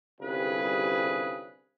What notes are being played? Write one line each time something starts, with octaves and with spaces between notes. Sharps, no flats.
G1 C2 C#3 G3 G#4 B4